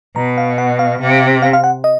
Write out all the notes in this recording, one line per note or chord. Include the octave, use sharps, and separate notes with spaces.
B2 A#5
F5
F#5
F5
C3
F5
F5
F#5
D#5